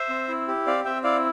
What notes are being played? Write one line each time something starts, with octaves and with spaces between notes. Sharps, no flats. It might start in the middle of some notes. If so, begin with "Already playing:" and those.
Already playing: C5 E5
C4
E4
G4
C4 D5 F5
C4 E5 G5
E4 D5 F5